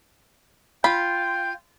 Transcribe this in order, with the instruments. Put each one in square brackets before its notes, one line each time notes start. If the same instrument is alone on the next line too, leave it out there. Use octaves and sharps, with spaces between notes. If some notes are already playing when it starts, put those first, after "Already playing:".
[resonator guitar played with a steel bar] F4 [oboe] G5 [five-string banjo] B5